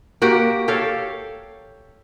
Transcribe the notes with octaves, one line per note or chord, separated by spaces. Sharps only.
A#3 F#4 G4
G4 A4 C#5 F5